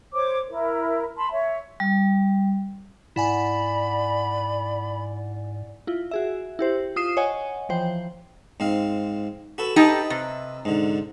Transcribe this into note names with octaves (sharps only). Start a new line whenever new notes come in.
C5 C#5 D6
E4 A#4
A5 B5 C6
C#5 E5
G3
G#2 E4 D5 F#5 G#5 B5
E4 F4
F#4 G#4 E5
E4 G4 C5
F4 D#6 C7 E7
C#5 D#5 F#5 G#5
E3 F3 C5 G5
G#2 C4 F5
F#4 A4 B4
D#4 G4 A4 B4 D#5 E5
C3
G#2 D3